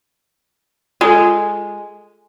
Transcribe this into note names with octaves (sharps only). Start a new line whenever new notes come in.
G#3 F4 A4